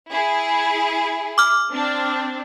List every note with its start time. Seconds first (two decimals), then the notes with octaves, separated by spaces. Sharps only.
0.11 E4 G#4
1.38 D6 F6
1.72 C4 D4